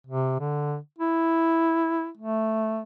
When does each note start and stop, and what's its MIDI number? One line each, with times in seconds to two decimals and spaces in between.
0.07 0.37 48
0.40 0.77 50
0.99 2.09 64
2.17 2.82 57